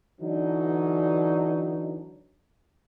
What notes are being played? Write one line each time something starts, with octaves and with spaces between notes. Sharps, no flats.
D3 E3 F#3 D4 D#4